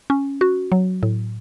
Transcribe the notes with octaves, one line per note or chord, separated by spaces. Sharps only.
C#4
F#4
F#3
A2